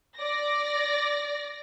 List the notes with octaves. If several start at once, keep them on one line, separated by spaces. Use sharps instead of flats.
D5 A#6